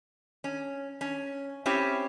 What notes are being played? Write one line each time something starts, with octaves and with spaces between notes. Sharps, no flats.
C#4
C#4
C4 C#4 E4 G4